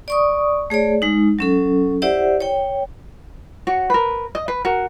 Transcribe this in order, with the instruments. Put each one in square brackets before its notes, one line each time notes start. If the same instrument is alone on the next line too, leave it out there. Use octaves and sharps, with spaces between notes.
[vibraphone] D5 C#6 D#6
A3 G#4 C#5 D5
G#3 D#4
F#3 C#4 A4
E4 G4 C5 D5 E5 F#5
C#5 G5
[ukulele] F#4 C#5
A#4 B4
D#5
B4
F#4 A#4